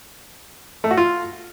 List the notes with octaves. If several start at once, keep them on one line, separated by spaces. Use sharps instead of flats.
A3
F#4
F4